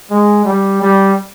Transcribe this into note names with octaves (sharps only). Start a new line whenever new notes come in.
G#3
G3
G3